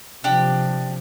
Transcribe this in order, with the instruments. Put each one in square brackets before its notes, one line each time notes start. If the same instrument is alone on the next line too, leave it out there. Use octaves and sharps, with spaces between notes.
[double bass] C3 F3 [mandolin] D4 G4